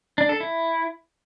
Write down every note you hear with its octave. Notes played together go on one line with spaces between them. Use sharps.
D4
A4
E4